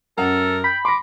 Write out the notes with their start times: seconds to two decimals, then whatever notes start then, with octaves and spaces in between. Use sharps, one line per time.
0.18 F#2 A4 A#4 F#5
0.64 G5 B5
0.85 C6 D6 A#6